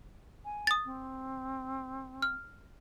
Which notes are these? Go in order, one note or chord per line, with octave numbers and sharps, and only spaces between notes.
G#5
D#6 A6
C4
F6